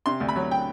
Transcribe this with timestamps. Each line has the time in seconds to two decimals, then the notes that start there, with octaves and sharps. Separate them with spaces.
0.06 C3 C6
0.20 D2
0.29 B5
0.36 F#3
0.51 G5